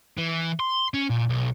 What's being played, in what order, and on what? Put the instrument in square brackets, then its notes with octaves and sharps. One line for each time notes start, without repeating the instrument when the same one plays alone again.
[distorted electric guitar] E3
C6
C#4
A#2
B1